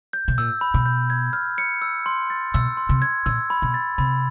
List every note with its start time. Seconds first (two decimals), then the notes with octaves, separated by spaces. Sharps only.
0.13 G6
0.28 B2
0.38 A#2 E6
0.61 B5
0.74 B2
0.86 G6
1.10 G#6
1.33 F6
1.58 C#7
1.82 E6
2.06 C6
2.30 A6
2.54 B2 E6
2.77 C6
2.89 C3
3.02 G#6
3.26 A#2 E6
3.50 B5
3.62 B2
3.74 A6
3.98 C3 B5